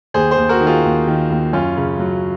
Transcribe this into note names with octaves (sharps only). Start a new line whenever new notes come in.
D#2 G#4 C5
G#4 C5
D#2
F#4 A#4
D#3
F4 G#4
D#2
D#3
D#2
F#2 C#4 F4
C#3
F#3